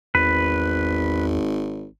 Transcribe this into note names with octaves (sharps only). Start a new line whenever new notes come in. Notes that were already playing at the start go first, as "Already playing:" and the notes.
G#1 E2 B4